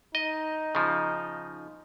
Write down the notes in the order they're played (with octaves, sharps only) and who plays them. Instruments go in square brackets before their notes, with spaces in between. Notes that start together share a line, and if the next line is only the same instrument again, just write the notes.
[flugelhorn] D#4 [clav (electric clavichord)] D#5
[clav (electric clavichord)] C#3 F3